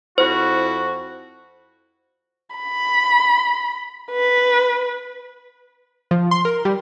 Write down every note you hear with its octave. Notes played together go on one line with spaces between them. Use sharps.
F2 E4 F#4 C5
B5
B4
F3
C6
A#4
G3